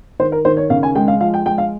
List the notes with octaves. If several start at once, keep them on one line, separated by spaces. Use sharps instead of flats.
D#3 C5
A#4
D#3 C5
C#5
C#3 F5
G#5
G#3 G5
F5
F3 F5
G5
G#3 G5
F5